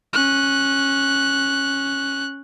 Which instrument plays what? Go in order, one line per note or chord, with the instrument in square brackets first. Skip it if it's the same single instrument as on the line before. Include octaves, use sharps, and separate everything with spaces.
[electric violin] C#4 F#6